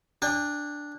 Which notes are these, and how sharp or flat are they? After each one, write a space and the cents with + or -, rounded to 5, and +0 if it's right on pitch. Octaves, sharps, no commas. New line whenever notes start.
D4 +0 G5 +45